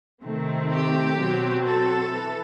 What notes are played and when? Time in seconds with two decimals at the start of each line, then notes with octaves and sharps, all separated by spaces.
0.23 C3 D#3 A3 C4
0.71 G4
1.18 B2 F#3 C4
1.66 A4
2.13 E3